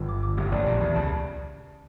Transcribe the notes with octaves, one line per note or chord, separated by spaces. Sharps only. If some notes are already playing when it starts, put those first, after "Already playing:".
Already playing: G1 G2
D6
D6
G1 G2 G4
A1 A2 D5
A#1 A#2 D5
E2 E3 D5
C#2 C#3 A5